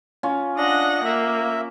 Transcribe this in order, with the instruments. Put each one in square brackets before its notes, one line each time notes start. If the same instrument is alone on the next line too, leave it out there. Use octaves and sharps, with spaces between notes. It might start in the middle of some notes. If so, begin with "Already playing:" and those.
[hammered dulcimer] C#4 F4
[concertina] D4 [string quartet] D#5 F#5 A#6
[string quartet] A#3 [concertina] E5